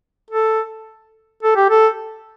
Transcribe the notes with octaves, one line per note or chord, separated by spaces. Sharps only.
A4
A4
G4
A4